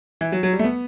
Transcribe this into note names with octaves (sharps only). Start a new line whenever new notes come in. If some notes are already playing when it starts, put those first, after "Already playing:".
E3
F#3
F#3
G3
A3
B3